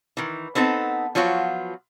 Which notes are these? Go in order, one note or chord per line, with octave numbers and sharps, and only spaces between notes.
D#3 E3
B3 C4 D#4 A4 F#5
F3 F#3 B3 F4 F#4